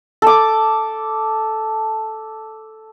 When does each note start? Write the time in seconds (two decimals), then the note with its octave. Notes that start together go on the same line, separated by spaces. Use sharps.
0.22 A4 D6